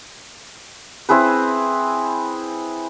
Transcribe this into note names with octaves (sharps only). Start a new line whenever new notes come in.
C4 E4 G#4 B4